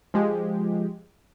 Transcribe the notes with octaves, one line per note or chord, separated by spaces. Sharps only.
F3 G#3 G4